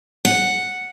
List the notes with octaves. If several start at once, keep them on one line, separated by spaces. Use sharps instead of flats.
F#5